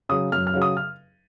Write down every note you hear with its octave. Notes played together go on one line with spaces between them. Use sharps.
C#3 F#3 D#6
F#2 F6
F6
C#3 F#3
D#6
F6